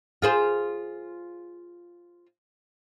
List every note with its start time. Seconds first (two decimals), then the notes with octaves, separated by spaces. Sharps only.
0.22 F4 G#4 C5